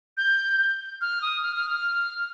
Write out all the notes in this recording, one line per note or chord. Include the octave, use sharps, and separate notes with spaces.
G6
F6
D#6
F6
F6
F6